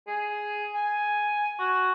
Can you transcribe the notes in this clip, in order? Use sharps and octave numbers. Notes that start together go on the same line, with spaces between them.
G#4
G#5
F#4